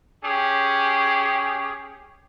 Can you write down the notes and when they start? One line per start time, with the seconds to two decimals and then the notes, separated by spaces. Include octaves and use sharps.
0.24 C#4 G4 G#4